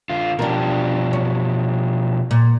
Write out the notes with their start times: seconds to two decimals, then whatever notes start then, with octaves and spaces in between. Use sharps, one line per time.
0.10 D3 F4
0.39 B2 F3 D4 G4 A#4
1.13 C#4
2.31 A#2